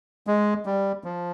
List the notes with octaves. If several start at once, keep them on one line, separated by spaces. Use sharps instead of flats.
G#3
G3
F3